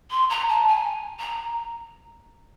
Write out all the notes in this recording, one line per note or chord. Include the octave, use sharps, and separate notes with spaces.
C6
A#5
A5
G#5
A#5